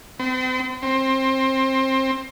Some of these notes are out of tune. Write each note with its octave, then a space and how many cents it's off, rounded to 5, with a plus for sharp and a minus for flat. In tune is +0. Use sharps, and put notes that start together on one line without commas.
C4 -40
C4 +20